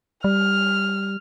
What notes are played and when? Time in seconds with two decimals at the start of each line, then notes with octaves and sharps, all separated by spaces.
0.24 G3 F6